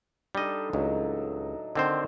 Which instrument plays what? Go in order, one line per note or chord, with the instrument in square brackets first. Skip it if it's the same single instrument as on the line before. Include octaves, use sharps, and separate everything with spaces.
[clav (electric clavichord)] G3 D#5 [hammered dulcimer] D4 D#4 A4
[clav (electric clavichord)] C#2 [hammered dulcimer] A2 F#3 D#4
[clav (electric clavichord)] D3 C4 C5 [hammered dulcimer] D#3